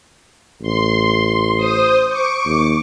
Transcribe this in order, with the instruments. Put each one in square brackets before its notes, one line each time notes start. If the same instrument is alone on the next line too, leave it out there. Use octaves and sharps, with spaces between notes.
[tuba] A1 [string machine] C6
[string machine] C5 D#6
C#6 D6
[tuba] D#2